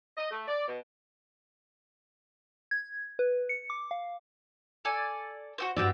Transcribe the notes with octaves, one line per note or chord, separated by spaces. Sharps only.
D#5
A3
D5
B2
G#6
B4
C#7
D6
F5
A4 D5 G#5
F#4 G4 C5
G2 C4 F#4 G4 D5 E5